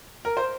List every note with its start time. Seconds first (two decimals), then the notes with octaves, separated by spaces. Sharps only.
0.25 A#4
0.37 C5